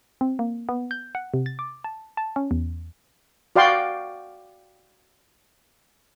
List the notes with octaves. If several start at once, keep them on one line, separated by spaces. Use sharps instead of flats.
C4
A#3
B3
G6
F#5
C3
A6
D6
A5
A5
C#4
E2
F#4 D5 F5 G5 C6